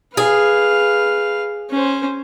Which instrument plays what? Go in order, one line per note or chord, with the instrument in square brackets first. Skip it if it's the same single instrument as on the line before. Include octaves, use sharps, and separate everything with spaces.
[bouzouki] G#4 [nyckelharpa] B4 F5
[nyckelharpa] C#4 C5